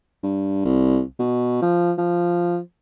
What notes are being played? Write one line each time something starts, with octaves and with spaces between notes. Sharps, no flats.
G2
C2
B2
F3
F3